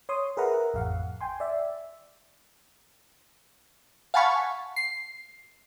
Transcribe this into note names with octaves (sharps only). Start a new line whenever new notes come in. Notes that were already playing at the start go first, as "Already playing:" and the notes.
C#5 C6 D#6
G#4 A#4 B4 E5 F#5 A#5
A1 F2 F5 F#5
G5 G#5 C6
D5 E5
F5 F#5 G#5 A5 B5 C#6
C7